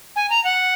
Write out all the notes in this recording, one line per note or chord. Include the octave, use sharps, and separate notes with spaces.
G#5
A#5
F#5